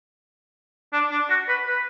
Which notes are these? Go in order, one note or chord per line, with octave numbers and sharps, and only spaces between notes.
D4
D4
F#4
B4
B4